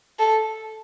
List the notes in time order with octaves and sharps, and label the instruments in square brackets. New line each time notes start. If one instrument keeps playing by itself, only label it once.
[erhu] A4